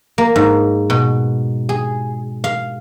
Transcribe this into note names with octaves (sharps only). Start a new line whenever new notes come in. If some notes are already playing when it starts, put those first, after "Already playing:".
A#3
G#2
B2
G#4
F5